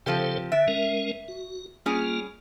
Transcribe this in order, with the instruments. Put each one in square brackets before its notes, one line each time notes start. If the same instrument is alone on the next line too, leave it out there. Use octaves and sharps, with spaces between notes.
[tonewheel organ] C#3 A4 C5 [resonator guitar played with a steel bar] F3 C4 G4
[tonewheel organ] D3 [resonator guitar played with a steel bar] E5
[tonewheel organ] G#3 C#4 A#4
F#4
[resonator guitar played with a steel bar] G3 C#4 G#4 [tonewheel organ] A#3 F4